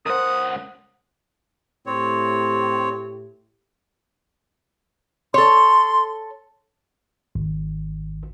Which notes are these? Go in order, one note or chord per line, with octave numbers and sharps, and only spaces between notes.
C#2 A#4 C5 F#5 D#6
A2 C4 G4 C#5
A4 C#5 C6
G#1